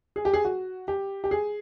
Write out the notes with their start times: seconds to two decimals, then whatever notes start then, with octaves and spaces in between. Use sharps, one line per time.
0.16 G#4
0.25 G4
0.33 G#4
0.45 F#4
0.88 G4
1.24 G4
1.31 G#4